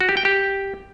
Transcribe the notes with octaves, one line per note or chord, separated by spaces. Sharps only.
F#4
G4
G5
G4